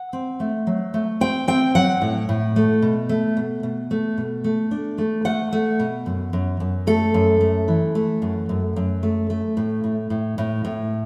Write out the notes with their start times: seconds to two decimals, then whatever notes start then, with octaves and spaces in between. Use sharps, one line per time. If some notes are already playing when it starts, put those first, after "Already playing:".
Already playing: F#5
0.13 C4
0.40 A3
0.67 F#3
0.94 A3
1.21 C4 G5
1.48 C4 G5
1.75 F#3 F#5
2.02 A2
2.29 A2
2.56 A3
2.82 B2
3.09 A3
3.37 B2
3.63 B2
3.91 A3
4.18 B2
4.44 A3
4.71 D4
4.98 A3
5.25 A3 F#5
5.53 A3
5.80 B2
6.06 F#2
6.33 F#2
6.60 F#2
6.87 A3 A4
7.14 F#2
7.41 A3
7.68 E3
7.95 A3
8.22 F#2
8.49 F#2
8.76 F#2
9.03 A3
9.30 A3
9.57 A2
9.84 A2
10.10 A2
10.38 A2
10.65 A2